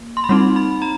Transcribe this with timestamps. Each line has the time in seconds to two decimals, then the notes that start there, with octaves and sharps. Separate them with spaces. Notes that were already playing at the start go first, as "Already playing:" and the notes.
Already playing: A#3
0.17 C6
0.24 B5
0.29 G3 C4 D#4 C6
0.56 B5
0.82 A#5